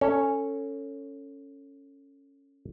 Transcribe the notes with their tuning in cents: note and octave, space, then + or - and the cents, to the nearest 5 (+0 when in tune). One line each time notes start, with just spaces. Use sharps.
C#4 +0 A4 +20 C#5 -5